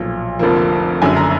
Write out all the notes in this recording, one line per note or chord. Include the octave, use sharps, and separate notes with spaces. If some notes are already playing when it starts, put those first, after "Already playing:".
Already playing: B1 A#2 F3
F1 F2 D3 F3 A#3
F#1 F#2 D3 G#5
A#5